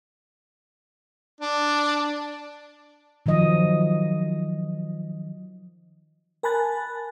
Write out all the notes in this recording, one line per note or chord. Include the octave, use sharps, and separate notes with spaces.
D4
D#3 F3 F#3 D#5
A#4 G#5 A5 B5 F#6 A6